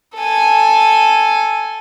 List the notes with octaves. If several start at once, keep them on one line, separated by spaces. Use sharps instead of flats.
A4 G#5